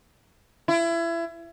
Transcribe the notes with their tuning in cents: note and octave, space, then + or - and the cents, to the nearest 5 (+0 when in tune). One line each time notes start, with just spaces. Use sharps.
E4 +30